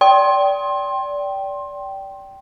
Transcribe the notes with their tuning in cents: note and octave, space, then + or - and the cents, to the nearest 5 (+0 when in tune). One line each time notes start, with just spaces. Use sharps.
D5 -25 G5 -10 C6 +20